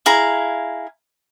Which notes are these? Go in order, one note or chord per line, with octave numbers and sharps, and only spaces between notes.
E4 G#4 F5 A#5